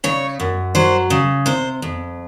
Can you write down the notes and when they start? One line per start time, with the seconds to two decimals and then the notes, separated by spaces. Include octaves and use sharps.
0.04 C#3 C#5
0.40 F#2
0.75 F#3 C5
1.10 C#3
1.46 C3 C5
1.82 F2